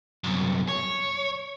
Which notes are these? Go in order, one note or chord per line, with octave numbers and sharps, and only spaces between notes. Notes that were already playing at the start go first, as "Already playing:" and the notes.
C2 F#2
C#5